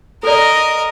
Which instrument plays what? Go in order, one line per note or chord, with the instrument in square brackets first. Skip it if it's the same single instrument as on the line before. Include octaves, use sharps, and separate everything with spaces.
[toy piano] A4 D5 [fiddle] A#4 D#5